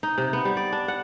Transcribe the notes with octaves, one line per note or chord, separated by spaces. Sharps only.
D#4
C3
B3
G3
D5
D4
F#5